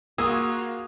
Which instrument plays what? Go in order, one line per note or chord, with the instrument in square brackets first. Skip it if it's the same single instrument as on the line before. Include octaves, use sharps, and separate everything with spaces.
[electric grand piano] A#3 [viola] F4 F#4 [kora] G#4 [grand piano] D#6 E6